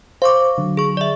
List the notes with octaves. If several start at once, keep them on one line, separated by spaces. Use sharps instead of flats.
C5 F5 C#6 D6
D3 F#3
G#4 C#6
D5 E5